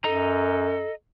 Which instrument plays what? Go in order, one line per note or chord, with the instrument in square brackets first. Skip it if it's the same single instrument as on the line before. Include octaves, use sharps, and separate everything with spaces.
[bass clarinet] F#2 [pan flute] A4 [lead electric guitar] D#5 A#5